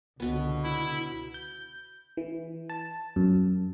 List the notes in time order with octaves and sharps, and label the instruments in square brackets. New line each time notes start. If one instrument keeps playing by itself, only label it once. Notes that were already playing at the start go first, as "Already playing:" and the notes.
[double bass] C#2 D3 [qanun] B2 B3
[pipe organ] E4
[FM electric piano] G6
E3
A5
F#2